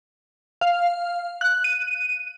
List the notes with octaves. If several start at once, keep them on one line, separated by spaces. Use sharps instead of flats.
F5
F#6
D#7